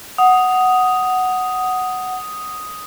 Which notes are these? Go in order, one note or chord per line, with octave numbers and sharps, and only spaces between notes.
F#5 D#6